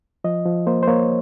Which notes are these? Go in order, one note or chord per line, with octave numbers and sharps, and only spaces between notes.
F3 D#5
F3
A#3 C5
C5
A#3 C#5